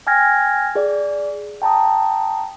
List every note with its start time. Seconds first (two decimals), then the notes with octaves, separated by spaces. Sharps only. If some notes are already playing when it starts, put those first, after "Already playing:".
0.07 G5 G#5 F6 G#6 A#6
0.75 G#4 D5
1.62 G5 A5 A#5 D#6